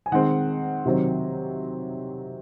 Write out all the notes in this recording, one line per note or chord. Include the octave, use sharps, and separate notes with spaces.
G#5
D#3 G#3 C4 F#5
C3 D#3 F#3 C4